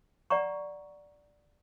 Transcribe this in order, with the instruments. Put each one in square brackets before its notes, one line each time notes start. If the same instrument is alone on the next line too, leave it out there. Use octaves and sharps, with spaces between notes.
[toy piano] D5 F#5 A#5 C#6